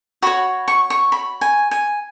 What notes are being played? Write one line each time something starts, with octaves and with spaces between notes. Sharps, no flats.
F#4 C#5 B5
C#6
C#6
B5
G#5
G#5